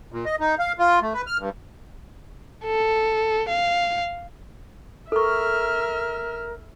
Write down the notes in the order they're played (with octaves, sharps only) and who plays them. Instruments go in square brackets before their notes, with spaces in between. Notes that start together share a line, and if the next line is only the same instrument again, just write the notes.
[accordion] A#2
D#5
D#4
F5
F4
A3
B4
F6
G2
[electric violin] A4
F5
[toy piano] A4 C#6 [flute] A#4 [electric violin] E5 F6